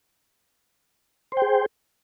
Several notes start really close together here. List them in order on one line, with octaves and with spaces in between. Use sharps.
C5 G5 G#4